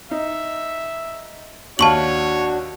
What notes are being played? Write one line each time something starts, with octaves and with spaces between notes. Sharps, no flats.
D#4 E5
D#2 D4 F#4 C#5 F5 A5 C#6 F#7